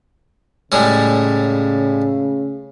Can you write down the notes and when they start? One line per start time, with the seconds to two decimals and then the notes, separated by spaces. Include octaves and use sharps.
0.72 A2 C#3 G3 G#3